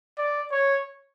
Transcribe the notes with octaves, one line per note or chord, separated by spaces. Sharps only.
D5
C#5